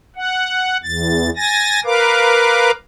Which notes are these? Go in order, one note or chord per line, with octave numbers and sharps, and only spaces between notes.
F#5
E2 A6
G#5 A6 A#6
A#4 B4 F5 D6